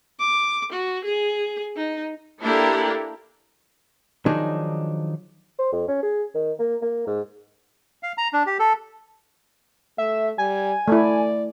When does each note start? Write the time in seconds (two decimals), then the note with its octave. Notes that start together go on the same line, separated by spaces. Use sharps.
0.19 D6
0.72 F#4
1.05 G#4
1.76 D#4
2.41 A#3 D4 E4 G4 A4 A#4
4.26 D#3 F3 F#3 D4 D#4 G#4
5.59 C5
5.72 F2
5.88 C#4
6.03 G#4
6.35 D#3
6.59 A#3
6.82 A#3
7.07 G#2
8.03 F5
8.18 A#5
8.33 D4
8.46 G4
8.59 A4
9.98 A3 E5
10.38 G3 G#5
10.88 A3 E4 D5